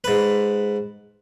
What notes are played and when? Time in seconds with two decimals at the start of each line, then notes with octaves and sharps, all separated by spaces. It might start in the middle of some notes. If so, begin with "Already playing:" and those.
0.04 G#2 B4